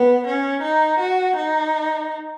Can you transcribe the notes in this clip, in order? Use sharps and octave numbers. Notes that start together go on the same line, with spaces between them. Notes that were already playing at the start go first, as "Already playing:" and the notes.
Already playing: B3
C#4
D#4
F#4
D#4